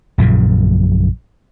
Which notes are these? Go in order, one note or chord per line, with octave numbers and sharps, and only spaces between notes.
A#1 F#2 A#2 C#3